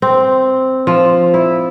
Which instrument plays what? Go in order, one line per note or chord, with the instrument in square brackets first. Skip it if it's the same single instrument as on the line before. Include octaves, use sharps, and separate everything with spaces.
[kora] C4
F3
E4